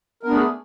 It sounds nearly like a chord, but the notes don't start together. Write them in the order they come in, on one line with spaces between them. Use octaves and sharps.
A#4 B3 D4 A3 G#4